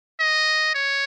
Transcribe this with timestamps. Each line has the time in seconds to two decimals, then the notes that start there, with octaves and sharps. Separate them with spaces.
0.20 D#5
0.74 C#5